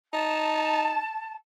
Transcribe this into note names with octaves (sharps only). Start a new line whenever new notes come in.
D#4 A5